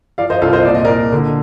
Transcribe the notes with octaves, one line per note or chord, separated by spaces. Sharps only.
F3 D5 F5
C5 D#5
C2 F4 A4
C5 D#5
A#2 D5
D#5
A#2 A#4 D5
D3